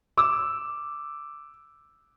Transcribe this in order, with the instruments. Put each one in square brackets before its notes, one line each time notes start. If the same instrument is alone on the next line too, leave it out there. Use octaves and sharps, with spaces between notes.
[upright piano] D6 E6